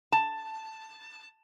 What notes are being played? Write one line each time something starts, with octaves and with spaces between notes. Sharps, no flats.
A5